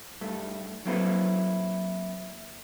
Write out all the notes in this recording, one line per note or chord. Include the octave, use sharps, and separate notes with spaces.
G2 A3
F#3 A#3 C4 E4 A4 B4